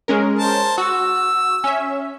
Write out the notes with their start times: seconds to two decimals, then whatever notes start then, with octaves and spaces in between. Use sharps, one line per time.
0.08 G#3 C#4 A#4
0.39 C5 A5
0.78 F#4 E6
1.64 C#4 E5